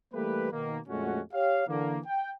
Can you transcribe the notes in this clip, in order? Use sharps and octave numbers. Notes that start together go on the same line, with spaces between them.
E3 G3 A3 A#3 G4 B4
B2 D#3 A#3
F2 A#2 G#3 A3 C#4 F#4
G4 C#5 F5
D3 E3 A#3
G5